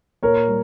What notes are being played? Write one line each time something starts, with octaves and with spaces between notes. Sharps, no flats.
A#2 A#4 C#5
G3